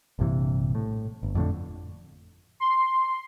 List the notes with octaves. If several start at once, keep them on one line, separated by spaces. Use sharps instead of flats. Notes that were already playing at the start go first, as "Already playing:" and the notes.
A#1 G2 C3 E3
A2
G1
F2 A2 D3
C6